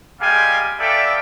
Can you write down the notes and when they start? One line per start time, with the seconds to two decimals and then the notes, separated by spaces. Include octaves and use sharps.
0.21 G3 G#3 G4 F5 G5 G#5
0.79 B3 A4 D5 E5 F5 G5